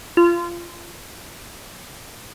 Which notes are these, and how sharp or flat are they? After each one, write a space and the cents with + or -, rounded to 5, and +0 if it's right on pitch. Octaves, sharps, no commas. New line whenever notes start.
F4 -20